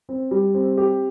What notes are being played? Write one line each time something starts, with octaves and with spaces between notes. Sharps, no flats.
C4
G3
C4
G4